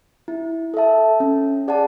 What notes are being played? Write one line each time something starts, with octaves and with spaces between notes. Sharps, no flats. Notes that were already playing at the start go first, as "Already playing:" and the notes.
E4
A4 E5 A5
C#4
G#4 D5 F#5 A5